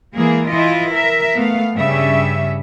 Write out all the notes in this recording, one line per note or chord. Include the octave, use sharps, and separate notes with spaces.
E3 G#3 A#3 G#4
E3 E4 F4 D#5
A#4 E5
A3 B3 F5
G2 C#3 G3 C#4 E5